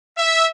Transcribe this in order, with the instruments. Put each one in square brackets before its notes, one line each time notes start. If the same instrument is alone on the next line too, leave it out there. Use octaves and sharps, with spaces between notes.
[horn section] E5